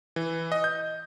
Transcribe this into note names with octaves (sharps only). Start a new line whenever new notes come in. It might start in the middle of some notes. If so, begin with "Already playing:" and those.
E3
D#5
G6